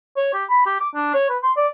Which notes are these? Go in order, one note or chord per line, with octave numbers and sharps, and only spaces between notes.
C#5
G4
B5
G4
D6
D4
C#5
B4
C6
D5